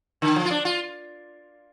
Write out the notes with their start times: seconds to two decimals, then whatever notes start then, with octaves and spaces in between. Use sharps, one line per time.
0.22 D3
0.36 F3
0.45 F4
0.51 D4
0.65 F4